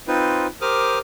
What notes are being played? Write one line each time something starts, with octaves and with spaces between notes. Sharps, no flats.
C4 D#4 F4 B4 C5
G4 A#4 C5 D6 D#6 F6